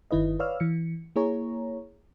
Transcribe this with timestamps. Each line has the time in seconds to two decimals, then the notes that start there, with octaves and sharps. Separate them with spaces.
0.11 G1 D#3 E4 B4 D#5
0.39 B4 C#5 D5 F5 E6 F6
0.60 E3 C#7
1.16 A#3 E4 G#4 C#5 A#5